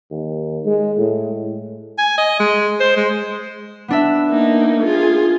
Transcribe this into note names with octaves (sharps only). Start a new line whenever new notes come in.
D#2
G#3
A2
G#5
D#5
G#3
C5
G#3
B3 D4 E5
A#3 D#4
F4 G#4